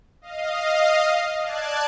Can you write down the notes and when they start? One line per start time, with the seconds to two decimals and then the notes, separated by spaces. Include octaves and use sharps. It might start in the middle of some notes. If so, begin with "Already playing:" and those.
0.22 D#5 F5
1.41 D5 A5 F#6 G#6